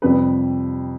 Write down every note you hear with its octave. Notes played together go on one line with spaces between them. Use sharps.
F2 C3 G3 B4